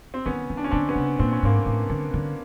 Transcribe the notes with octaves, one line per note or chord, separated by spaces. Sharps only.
C4
D#3 B3 C#4
D#3
D4
C#4
D3 C4 D4
B3 C#4
C#3
A#2 C4
C#4
G#2 A#3 C4
A2
D3
D3